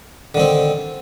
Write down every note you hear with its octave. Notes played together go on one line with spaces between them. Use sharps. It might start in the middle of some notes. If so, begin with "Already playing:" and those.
D3 D#3 C4